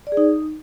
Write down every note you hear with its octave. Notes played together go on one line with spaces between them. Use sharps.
D5
G#4
D#4